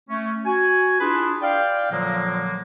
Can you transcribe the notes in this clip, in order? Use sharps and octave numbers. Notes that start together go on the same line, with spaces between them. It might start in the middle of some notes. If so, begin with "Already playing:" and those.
A3 C#4
F#4 G#5
D4 E4 F4 G#4 B4
D5 F5 G5
A#2 D3 F3 F#3 G#3 A#3